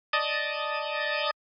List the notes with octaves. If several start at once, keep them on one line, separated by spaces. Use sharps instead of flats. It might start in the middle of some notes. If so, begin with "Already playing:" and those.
D5 D#5 A5 D#6